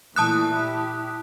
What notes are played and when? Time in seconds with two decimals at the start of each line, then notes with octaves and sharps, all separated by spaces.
0.16 A#2 E3 A3 A5 D#6 F#6
0.54 E4 G4